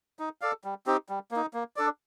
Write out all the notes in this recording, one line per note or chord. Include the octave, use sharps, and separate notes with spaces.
D#4
A4 D5 F5
G3
C4 D#4 G4
G3
A#3 D#4
A#3
D4 A4 D5